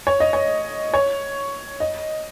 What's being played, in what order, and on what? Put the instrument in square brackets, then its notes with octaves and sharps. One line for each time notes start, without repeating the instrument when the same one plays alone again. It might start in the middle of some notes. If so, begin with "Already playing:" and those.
[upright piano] C#5
D#5
C#5
C#5
D#5